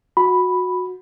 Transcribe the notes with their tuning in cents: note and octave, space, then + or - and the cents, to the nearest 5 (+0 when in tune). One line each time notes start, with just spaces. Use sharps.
F#4 -20 B5 +0